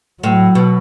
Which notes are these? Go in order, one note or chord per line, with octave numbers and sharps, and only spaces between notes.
A2 F#3
B2